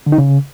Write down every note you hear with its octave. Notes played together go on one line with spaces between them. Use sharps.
D3
D#4
C#3